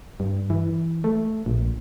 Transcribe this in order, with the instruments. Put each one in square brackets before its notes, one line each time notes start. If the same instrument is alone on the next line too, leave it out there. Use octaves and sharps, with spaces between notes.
[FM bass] G2
E3
A3
A#1